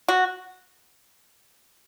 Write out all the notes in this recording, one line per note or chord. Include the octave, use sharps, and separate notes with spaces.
F#4